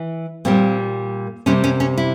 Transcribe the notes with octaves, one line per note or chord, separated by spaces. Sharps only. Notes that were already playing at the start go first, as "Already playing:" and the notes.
Already playing: E3
A#2 G3 A#3 C4
C3 G3 A#3 C#4
C#4
C#4
E4